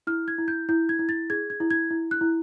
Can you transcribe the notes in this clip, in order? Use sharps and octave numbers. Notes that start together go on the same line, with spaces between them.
E4 F6
G#6
E4
G6
E4 G6
G#6
E4
A6
G#4 G#6
G#6
E4
G#6
E4
F#6
E4